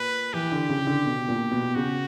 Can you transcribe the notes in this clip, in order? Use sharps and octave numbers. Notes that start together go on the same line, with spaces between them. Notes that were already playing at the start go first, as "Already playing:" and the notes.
Already playing: A#2 B4
E3 G4
D3
C#3
D3
B2
A#2
B2
C#3 F#4